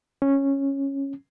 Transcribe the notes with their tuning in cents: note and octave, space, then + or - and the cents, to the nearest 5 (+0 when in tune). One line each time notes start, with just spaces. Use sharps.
C#4 -10